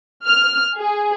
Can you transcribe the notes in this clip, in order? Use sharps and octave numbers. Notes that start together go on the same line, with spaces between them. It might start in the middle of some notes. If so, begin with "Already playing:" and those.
F6
G#4